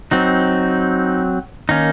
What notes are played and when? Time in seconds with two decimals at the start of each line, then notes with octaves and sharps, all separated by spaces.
0.11 F#3 C4 D#4
1.69 D#3 A#3 C#4 D#4